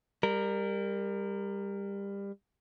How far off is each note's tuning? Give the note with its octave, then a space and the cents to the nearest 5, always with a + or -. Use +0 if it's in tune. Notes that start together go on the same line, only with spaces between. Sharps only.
G3 +25 A#4 -10